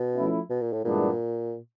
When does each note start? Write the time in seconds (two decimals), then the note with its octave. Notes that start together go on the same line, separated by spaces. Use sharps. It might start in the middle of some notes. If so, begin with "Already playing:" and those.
Already playing: B2
0.15 F3 A3 C#4 E4
0.50 B2
0.61 A#2
0.73 A2
0.84 G2 A#2 E3 G#3 B3 D4